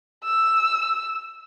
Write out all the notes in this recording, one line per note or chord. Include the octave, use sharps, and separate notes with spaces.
E6